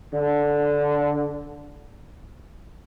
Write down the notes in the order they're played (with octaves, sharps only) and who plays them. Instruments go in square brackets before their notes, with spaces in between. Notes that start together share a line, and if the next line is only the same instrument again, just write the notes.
[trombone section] D3